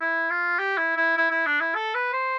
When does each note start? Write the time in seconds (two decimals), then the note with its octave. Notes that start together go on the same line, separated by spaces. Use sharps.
0.01 E4
0.30 F4
0.59 G4
0.78 E4
0.97 E4
1.17 E4
1.31 E4
1.47 D4
1.60 E4
1.75 A4
1.95 B4
2.13 C5